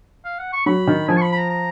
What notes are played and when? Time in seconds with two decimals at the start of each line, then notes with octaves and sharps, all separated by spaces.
0.25 F5
0.39 F#5
0.53 C#6
0.66 F#3 B5
0.87 D#3
1.08 F3 G#5
1.17 C#6
1.22 B5
1.32 B5
1.35 A#5
1.49 A#5